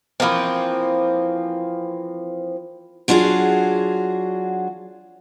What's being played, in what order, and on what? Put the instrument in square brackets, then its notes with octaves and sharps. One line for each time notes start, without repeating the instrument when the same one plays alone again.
[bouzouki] E3 F3 A#3 C4
[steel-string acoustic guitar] F#3 D4 F4 F#4 G#4